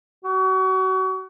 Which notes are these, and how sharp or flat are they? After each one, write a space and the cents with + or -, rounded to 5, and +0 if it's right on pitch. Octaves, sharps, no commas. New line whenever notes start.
F#4 +30